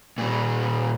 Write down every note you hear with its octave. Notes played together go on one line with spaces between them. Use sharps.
A#2 G3